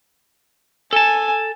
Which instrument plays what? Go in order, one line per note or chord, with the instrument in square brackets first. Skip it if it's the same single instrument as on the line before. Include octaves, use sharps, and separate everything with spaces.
[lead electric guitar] A4 A5 [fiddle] G#5